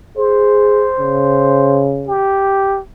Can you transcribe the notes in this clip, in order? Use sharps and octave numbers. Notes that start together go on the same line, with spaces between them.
G#4 C5
C#3
G4